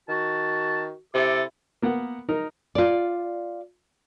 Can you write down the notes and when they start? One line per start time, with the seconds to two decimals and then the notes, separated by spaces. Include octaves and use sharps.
0.09 D#3 F#4 A5
1.14 C3 E4 A4 D6
1.82 A#3 B3 F#5
2.29 D#4 A#4
2.75 F4 D5